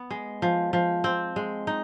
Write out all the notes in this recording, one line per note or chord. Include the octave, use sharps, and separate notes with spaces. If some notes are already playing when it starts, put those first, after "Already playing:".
Already playing: B3
G#3
F3
F3
C4
G#3
D#4